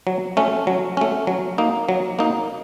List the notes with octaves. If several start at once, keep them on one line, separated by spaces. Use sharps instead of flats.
F#3
A3 C#4
F#3
A3 C#4
F#3
A#3 D#4
F#3
A#3 D#4